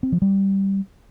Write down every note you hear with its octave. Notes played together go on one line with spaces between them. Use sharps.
C4
F3
G3